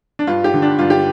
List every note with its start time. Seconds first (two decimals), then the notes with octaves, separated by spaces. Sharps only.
0.19 D4
0.27 G2 F4
0.44 G4
0.54 D3
0.62 D4
0.79 G2 F4
0.90 G4